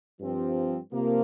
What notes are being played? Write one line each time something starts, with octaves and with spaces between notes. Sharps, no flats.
G2 F3 C4
C3 F3 A#3